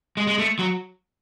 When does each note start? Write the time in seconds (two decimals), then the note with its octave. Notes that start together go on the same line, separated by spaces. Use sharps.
0.17 G#3
0.27 G#3
0.39 A3
0.59 F#3